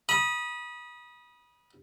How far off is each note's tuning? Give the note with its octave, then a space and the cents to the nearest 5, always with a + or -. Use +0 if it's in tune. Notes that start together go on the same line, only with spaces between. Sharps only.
B5 -30 D#6 +0